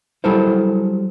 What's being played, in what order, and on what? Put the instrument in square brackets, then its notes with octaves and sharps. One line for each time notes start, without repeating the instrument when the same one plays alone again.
[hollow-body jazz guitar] F#3 G3 E4 A4 A#4 C5